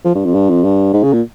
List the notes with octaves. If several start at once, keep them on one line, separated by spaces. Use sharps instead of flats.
F3
G2
F2
G2
F2
G2
G#2
C#3
A#2